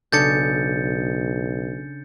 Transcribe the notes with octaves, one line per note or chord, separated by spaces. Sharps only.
B1 C#3 D4 A4 G6 A6 C#7